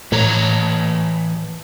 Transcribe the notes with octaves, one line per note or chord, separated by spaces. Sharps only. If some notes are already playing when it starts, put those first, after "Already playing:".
A2 E3 C#5 A#5